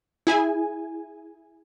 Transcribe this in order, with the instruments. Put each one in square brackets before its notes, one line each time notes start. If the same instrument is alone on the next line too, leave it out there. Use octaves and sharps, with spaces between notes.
[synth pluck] E4 G#4 G#5